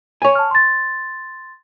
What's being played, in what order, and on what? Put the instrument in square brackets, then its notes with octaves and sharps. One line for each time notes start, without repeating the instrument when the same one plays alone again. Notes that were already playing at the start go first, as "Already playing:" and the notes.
[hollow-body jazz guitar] C#5 G#5
[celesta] A5 F6
C6 A6